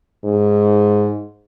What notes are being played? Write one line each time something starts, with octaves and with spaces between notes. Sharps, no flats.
G#2